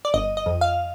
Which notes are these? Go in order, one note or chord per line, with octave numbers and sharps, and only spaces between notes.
D5
G1 D#5
D#5
F2
F5